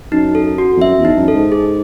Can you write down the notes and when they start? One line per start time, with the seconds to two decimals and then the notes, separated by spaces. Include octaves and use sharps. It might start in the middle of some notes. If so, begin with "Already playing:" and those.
0.12 F#2 D#4
0.35 A4
0.58 F#4
0.77 E2
0.81 F#2 E5
0.99 E2
1.05 D#4
1.16 F#2
1.28 A4
1.34 G#2
1.52 G#4